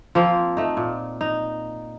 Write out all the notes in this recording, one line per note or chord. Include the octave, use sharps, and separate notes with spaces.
F3 A#3 C4
A3 D#4
A#2
D#4